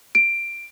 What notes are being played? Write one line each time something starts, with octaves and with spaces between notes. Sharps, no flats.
D7